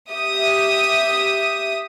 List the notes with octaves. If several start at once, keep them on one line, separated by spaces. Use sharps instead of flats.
G4 E5 D#6